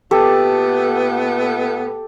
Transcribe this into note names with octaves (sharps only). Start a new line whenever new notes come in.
A#2 A3 B3 G4 A4